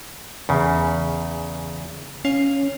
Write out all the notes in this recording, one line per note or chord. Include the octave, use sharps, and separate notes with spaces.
E2 C#3
C#4 F5